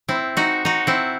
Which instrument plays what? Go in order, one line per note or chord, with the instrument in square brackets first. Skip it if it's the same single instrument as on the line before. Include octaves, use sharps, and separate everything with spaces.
[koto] C4 E4
D#4 F#4
D#4 F#4
C4 E4